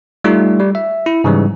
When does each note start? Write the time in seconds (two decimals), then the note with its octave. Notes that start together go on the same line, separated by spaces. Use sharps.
0.24 G3 A3 D#4 F4
0.59 G3
0.75 E5
1.06 E4
1.24 G#2 C#3 E3 G3